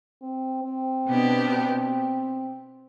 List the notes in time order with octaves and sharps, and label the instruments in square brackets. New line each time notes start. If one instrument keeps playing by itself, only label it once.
[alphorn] C4
C4
[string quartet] B2 B3 D4 G4